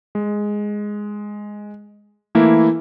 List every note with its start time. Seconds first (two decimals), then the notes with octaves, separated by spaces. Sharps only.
0.15 G#3
2.35 E3 A3 A#3 E4